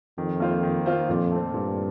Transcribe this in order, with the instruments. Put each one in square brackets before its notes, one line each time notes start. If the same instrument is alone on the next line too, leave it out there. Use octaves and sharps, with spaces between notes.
[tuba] F2 [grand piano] D#3
[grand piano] A#3 F4 C5
D#3
A#3 F4 C5
[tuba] F2 [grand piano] A#2
[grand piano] A3 C4
[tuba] G2 [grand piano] A#2